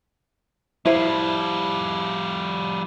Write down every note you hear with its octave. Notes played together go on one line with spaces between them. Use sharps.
F3 G3 E4 C5